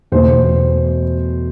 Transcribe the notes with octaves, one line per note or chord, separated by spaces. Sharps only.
E2 B2 A3 C5